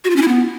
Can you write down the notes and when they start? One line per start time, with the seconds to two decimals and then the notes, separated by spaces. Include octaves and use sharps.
0.04 F#4
0.10 F4
0.16 C#4
0.22 E4
0.28 B3